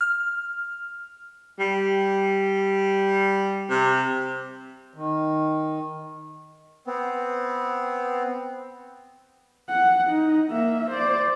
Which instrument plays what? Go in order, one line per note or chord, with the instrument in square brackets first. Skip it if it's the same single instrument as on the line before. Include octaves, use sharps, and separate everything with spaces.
[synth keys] F6
[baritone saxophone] G3
C3
[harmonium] D#3
[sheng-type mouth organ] B3 C4
[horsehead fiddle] F#5
D#4
A#3 E5
C5 D5